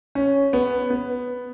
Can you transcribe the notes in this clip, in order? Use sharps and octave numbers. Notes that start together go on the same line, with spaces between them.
C#4
B3
B3